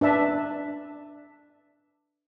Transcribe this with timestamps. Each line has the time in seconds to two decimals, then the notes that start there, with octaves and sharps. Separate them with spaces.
0.01 D4 B4 E5 A5